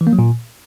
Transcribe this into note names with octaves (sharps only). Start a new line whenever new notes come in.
E3
A#3
F#3
A#2